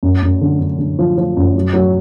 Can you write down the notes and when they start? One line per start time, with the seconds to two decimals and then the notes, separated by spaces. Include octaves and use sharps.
0.03 F#2
0.23 F#2
0.41 D3
0.60 D3
0.78 D3
0.99 F3
1.18 F3
1.37 F#2
1.55 F#3
1.74 F#3